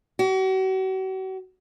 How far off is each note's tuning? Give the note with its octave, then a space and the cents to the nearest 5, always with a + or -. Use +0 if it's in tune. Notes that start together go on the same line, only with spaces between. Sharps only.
F#4 +40